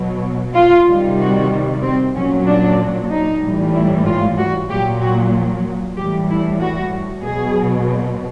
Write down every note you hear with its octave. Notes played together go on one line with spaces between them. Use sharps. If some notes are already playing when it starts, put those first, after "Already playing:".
Already playing: B2 F#3
F4
C3 D#3 G3
F#4
C4
A#2 F#3 C#4
D4
D#4
A2 E3 G3
E4
F4
F#4
A#2 F#3 G4
F#4
A2 E3 G3 G4
E4
F#4
B2 F#3 G#4